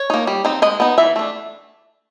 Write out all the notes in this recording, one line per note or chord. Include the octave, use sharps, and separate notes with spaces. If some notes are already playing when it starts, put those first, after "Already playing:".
Already playing: C#5
A#3 D#4
G3
C4 D#4
G#3 D#5
B3 D#4
E3 E5
A3 D4